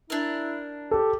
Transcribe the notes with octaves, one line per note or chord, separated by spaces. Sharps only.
D4 E4 A#4
G4 A4